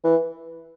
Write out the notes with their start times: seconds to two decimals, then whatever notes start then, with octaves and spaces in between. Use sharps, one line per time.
0.04 E3